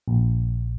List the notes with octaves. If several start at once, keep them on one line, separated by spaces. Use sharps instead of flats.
A#1